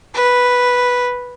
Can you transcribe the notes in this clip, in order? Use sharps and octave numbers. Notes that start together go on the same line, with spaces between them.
B4